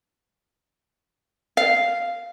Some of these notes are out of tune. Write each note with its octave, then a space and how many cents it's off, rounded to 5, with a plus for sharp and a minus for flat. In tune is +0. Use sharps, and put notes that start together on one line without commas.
F5 -5